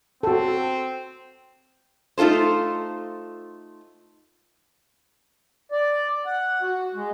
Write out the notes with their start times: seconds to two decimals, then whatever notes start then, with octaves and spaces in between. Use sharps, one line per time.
0.23 C4 F#4 A4
2.18 A3 D#4 F4 A4 C5
5.72 D5
6.26 F#5
6.62 F#4
6.95 G#3